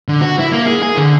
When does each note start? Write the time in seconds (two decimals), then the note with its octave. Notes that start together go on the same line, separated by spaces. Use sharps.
0.08 D3
0.21 F#4
0.39 E4
0.52 A#3
0.66 G#4
0.83 G#4
0.97 D3